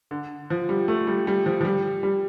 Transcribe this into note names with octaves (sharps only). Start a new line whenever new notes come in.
D3
F3
G3
A3
G3
G3
F3
F3
G3
G3